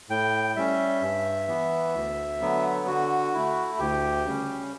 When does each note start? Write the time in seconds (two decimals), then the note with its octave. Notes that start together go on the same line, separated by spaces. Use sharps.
0.10 A2 G5
0.56 G3 C#4 E5
1.02 G2
1.48 E3 B3
1.95 D2
2.41 D3 F#3 B3
2.87 D3 F#4
3.34 A3 E4
3.79 D2 G4
4.26 C#3 G3 C#4